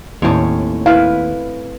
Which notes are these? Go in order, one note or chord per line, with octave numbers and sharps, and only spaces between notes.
D#2 A2 C4 C#4 C#5
E4 B4 F5